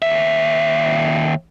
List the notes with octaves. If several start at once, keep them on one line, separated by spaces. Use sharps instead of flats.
D#2 E5